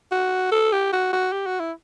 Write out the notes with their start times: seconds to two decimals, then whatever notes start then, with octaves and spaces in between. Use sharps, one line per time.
0.12 F#4
0.52 A4
0.72 G4
0.93 F#4
1.13 F#4
1.32 G4
1.46 F#4
1.60 E4